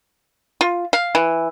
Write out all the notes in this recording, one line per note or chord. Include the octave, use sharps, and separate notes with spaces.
F4
F5
E3